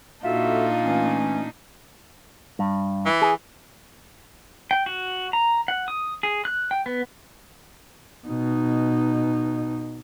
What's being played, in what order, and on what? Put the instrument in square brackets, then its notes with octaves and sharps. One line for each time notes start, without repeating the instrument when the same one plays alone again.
[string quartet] A#2 D4 D#4 [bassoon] F4 [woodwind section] F#4 A4 E5
[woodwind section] E3 A3 C#4
[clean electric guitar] G2
[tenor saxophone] E3
[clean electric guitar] G#4
[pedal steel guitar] G5
F#4
A#5
F#5
D#6
G#4
F#6
G5
B3
[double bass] B2 D#4